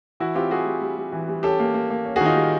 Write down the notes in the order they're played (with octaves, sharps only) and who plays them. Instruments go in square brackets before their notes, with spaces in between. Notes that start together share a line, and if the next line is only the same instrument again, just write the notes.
[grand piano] E3 E4 F#4
C4 F4 G4
G3 F#4 G#4
G3
G3
G3
E3
G3
C#4 G4 A4
A#3
A#3
A#3
C#4
F#4 G#4
D#3 D#4 F4
G3